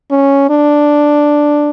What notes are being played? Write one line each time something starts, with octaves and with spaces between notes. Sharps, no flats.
C#4
D4